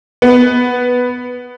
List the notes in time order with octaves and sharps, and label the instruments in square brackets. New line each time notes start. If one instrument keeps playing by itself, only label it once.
[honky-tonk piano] B3